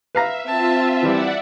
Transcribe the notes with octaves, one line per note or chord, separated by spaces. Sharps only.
B4 E5 F5 A#5
C4 F4 E5 A5
E3 G3 D5 E5 F#5